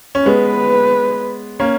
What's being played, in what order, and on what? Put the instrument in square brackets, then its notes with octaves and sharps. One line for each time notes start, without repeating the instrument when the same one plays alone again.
[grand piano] C#4
[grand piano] G#3 B3 [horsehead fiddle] B4
[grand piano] A#3 C#4